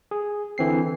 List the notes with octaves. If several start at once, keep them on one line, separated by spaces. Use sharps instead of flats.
G#4
D3 E3 C4 C7